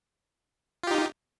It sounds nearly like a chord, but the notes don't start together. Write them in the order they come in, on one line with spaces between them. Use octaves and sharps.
F4 G4 D#4